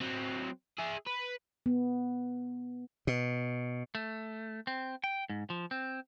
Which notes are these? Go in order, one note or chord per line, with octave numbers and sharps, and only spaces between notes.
F#3 C4
G#4 E5
B4
B3
B2
A3
C4
G5
G#2
F3
C4